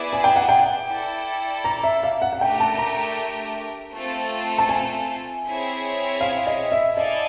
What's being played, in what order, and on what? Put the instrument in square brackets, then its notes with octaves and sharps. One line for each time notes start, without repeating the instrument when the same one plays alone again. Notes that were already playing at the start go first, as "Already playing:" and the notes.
Already playing: [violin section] B3 E4 G#4 B4 D5
[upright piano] G#5
G5
F#5
G5
[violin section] E4 A4 D5
[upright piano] A#5
E5
F5
F#5
F#5
[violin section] A3 D4 G4 A#4 [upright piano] G5
[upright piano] A5
A#5
[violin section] A3 C4 F4 A4
[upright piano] A5
G#5
[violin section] C4 E4 G#4 C#5 E5
[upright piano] F5
D#5
E5
[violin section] E4 A4 D5 F5 G#5 [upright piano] D#5